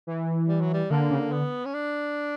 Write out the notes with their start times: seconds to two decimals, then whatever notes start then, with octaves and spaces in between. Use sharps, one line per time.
0.07 E3
0.48 G3
0.61 F#3
0.73 G3
0.90 D3 A#3
1.10 C#3
1.18 D3
1.32 B3
1.65 C#4
1.74 D4